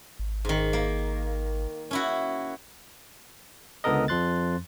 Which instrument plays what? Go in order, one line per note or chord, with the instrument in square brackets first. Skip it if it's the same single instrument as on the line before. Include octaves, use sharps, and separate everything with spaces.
[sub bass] G#1
[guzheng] G#2 D#3
A#3
C#4 E4 F#4
[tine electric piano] C#2 D3 B3 A4 A#4 D#5
F2 F3 C6 F#6 A6